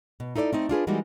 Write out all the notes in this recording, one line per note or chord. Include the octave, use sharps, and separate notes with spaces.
B2
D#4 E4 A4 C#5 D5
A3 C4 D#4
D4 F4 G#4 B4
E3 G3 G#3 A#3 D#4 F#4